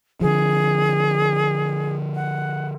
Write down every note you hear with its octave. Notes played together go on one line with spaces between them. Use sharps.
D3 F3 G#4
F#5